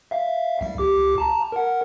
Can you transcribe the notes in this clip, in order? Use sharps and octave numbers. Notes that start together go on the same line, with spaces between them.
E5 F5
C2 G3
C#2 G4 D6
A5 A#5
A#4 F#5